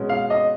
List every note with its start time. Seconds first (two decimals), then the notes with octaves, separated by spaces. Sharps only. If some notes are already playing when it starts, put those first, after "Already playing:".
Already playing: B2 G#3 C#4
0.09 F5
0.30 D#5